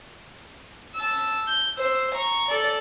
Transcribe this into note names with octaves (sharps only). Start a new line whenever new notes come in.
A5 E6
G6
C5 E6
A#5 C#6
A4 D5